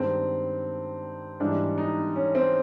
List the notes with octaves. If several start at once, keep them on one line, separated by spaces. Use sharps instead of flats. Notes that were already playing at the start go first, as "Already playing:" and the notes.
Already playing: G2 D#3 G#3 C4
G#2 E3 G3 D4
D#4
C#4
C4